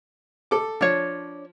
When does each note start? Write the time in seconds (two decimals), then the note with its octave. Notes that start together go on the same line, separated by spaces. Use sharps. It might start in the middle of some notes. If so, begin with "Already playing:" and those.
0.51 A4 D6
0.81 F3 D4 C#5